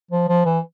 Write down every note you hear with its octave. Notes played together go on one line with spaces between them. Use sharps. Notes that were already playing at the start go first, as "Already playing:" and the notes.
F3
F3
E3